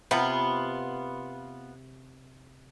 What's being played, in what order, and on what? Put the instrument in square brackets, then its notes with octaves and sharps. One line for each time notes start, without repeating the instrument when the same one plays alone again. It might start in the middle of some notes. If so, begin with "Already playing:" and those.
[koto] C3 [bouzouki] B3 F4